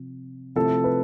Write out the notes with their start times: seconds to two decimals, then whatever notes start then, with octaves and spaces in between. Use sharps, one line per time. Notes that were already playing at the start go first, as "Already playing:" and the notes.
Already playing: C3 F3
0.55 C3 F3 A3 E4 A4
0.84 B4